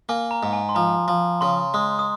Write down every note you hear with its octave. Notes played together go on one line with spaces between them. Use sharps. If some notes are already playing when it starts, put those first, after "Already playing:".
A#3 G#5
A#5
G#2
G#5
C6
F3 A#5
F3
C#3 C6
G#3 D#6
D#6